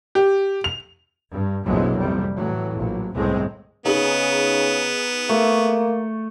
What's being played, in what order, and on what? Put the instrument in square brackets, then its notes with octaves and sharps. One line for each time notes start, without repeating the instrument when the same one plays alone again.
[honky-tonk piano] G4
F7
[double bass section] G2
A#1 F2 B2 E3 F#3 G#3
F2 C3 G3
A2 E3 F#3
A#1 F#3
G1 C2 A2 G#3 C4
[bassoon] C#3 [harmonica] B3 [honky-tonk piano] D#4 G#4 F#7
[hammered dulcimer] A3 [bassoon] A#3